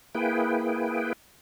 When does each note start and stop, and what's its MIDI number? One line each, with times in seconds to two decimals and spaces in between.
0.15 1.13 58
0.15 1.13 64
0.15 1.13 68
0.15 1.13 71
0.15 1.13 79